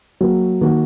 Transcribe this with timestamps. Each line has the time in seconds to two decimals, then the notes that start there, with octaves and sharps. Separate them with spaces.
0.21 F#3 A#3 F#4
0.61 D#3 A#3 F#4